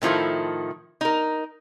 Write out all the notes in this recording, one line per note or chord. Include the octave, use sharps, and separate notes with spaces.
A2 D#3 F3 E4 A4
D#4 A#4